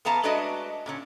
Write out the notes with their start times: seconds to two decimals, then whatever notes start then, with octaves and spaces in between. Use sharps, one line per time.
0.05 E2 B3 F5 A5 A#5
0.23 G#3 A3 D4 F#4 B4 D#5
0.86 A#2 D3 C#4